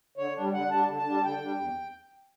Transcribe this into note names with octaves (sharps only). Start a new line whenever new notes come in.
D3 C#5
G3 D4
D3 F#5
G3 D4 A5
D3
A5
G3 D4
D3 G5
G3 D4
E2